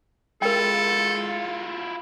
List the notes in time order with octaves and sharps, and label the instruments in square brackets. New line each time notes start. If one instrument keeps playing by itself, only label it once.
[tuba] G#3 [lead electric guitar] E4 F4 [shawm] A4 [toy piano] A#4 G5